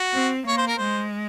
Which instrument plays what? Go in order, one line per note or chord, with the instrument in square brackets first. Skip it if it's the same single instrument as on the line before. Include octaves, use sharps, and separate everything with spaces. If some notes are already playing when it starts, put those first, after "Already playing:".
Already playing: [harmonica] F#4
[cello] C4
[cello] A#3 [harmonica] C#5
[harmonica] C5
A#4
[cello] G#3 [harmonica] C5